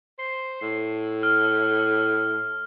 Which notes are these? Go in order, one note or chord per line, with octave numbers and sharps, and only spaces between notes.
C5
A2
F6